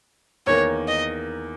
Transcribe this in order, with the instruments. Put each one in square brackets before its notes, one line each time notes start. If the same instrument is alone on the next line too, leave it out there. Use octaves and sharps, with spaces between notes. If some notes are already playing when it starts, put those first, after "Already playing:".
[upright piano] E2 D#3 A#3 [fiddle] C#5
[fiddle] D#5